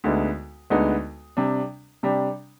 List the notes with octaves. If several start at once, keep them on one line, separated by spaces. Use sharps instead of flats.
D2 D3 G#3 B3 D#4
D2 D3 G#3 B3 D#4
C3 G3 D4
C3 G3 D4